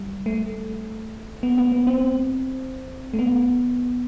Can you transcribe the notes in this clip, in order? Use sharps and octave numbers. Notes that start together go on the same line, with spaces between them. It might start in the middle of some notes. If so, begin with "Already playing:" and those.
Already playing: G3
A3
B3
B3
B3
C4
A3
B3